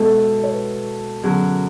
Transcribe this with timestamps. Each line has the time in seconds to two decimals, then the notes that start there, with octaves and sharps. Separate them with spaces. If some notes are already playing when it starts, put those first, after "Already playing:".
Already playing: B2 G#3 B3 E4 A4
0.43 C#5
0.53 B4
1.23 F#2 D3 F#3 B3 G#4